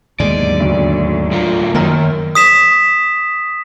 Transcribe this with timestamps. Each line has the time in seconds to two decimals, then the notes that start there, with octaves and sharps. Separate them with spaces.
0.20 D#2 G#2 B2 D3 F#3 G#3 D5
0.60 D2
1.31 A2 F4
1.75 F#2 D#3 A#3 F6
2.35 D#6 B6 E7